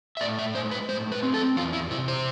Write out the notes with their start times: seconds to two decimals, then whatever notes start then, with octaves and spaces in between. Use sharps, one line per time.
0.17 E5
0.21 A2 D5
0.39 E5
0.55 G#3 C5
0.71 B4
0.89 A2 C5
1.12 B4
1.23 C4
1.34 A4
1.57 E2 F4
1.73 E4
1.90 C3 E4
2.08 C5